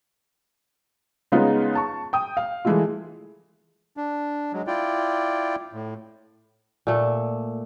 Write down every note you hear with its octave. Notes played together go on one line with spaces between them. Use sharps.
C#3 G#3 B3 D#4 F4 G#4
A5 C#6
G5 D#6
F5
E3 G#3 A3 E4 F4
D4
F#3 G#3
E4 F4 D5 G5
A2
A#2 A3